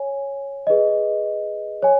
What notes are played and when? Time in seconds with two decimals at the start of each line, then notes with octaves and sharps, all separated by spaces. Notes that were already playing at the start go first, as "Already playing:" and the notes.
Already playing: C#5 G#5
0.67 G#4 B4 D#5
1.82 C#5 G#5